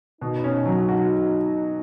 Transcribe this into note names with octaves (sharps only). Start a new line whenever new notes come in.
B2 D#4
C#4
F#3
F#4